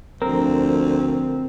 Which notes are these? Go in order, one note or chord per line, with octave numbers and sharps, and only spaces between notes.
D2 D3 F3 C4 A#4